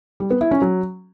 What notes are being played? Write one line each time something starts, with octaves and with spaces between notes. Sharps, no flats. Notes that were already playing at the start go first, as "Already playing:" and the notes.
G3
B3
E4
C#4
F#3